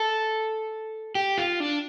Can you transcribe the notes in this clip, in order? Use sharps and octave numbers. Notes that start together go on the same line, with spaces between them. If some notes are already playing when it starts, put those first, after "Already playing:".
Already playing: A4
G4
F4
D4